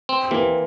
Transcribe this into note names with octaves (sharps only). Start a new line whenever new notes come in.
C4
E3 A#3